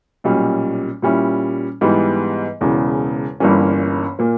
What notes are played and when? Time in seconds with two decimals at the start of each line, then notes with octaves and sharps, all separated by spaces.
0.24 B1 A#2 G3 C#4
1.02 A#2 G3 C#4 E4
1.81 G#2 E3 G3 B3
2.61 E1 E2 C#3 E3
3.40 G1 G2 E3 A#3 C#4
4.19 A#2 A#3